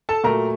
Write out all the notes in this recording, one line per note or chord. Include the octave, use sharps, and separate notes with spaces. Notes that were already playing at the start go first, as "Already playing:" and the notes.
A4 A5
A#2 F#3 A3 A#4 A#5